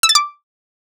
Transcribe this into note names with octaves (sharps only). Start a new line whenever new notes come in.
E6
A6
D6